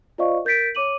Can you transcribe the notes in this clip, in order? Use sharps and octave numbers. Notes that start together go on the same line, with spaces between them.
F4 C5 D5 D#5 F5 C#6
A#4 G6 A6 B6 D7
C#5 D6 D#7 F#7